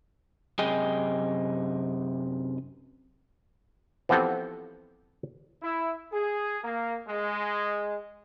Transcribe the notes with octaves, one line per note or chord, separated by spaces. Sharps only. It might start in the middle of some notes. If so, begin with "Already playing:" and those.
F#2 C3 G#4 D#5 G5 G#5
E3 F3 B3 C4 G4 A4
E4
G#4
A#3
G#3